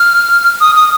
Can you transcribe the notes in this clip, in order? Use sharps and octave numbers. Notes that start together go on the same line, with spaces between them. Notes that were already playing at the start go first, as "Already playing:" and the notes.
Already playing: F6
D#6
D#6